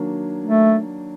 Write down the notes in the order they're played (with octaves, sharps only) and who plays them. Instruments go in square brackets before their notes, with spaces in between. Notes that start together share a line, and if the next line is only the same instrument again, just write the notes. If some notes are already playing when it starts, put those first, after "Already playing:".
Already playing: [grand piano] D#3 F#3 A#3 D4
[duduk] A3